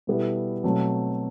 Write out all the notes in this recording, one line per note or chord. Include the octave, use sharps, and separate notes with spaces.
B2 G3 B3 E4 A4
B2 F#3 A3 C4